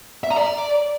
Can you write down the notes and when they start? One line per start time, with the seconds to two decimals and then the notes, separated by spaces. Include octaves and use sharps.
0.24 E5
0.30 A#5
0.37 D5